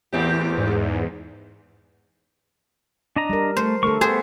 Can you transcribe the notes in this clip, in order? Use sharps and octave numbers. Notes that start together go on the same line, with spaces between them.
E2 A2 C4 G4
G#2
D4 D#5 A#5
G3 A#4
A3 C5
D3 A3 A4 A#4 C#6
B3 G4 G#4 C5